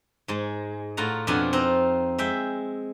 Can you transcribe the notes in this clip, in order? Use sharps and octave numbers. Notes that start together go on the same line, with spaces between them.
G#2 G#3
A2 F4 F#5 A#5
F2 B2 D4 F4 F#5 G#5
C4 D#4 A#5
G#3 E5 G5